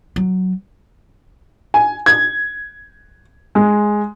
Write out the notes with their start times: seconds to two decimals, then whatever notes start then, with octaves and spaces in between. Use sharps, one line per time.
0.16 F#3
1.74 G#5
2.06 G#6
3.55 G#3